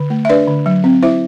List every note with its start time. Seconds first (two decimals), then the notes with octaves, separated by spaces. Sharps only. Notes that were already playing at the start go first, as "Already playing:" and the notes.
Already playing: D3
0.10 A3
0.25 E5
0.29 D4 B4 D5
0.48 D3
0.66 F#3
0.84 C4
1.03 E4 C5 E5